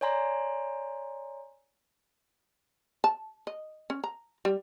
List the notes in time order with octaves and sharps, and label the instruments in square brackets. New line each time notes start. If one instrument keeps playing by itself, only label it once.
[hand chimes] C#5 D5 G#5 A#5 C6
[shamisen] A5
D#5
C#4
A#5
G3